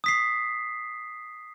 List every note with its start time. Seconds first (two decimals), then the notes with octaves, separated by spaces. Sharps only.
0.04 D#6 B6 C7